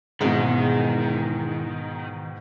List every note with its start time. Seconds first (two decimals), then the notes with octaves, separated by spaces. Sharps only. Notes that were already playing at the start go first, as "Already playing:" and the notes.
0.21 E2 G#2 B2 D#3 G#3